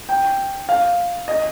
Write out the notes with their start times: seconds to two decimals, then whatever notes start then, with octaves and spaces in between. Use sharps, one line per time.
0.09 G5
0.69 F5
1.28 D#5